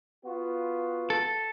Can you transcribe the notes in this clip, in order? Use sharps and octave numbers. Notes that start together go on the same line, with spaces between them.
B3 F4 F#4
A4